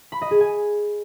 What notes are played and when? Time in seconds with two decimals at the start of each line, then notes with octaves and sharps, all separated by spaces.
0.12 B5
0.21 D#5
0.31 G#4
0.40 G#5